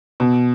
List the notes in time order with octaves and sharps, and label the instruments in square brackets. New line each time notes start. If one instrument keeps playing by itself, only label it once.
[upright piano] B2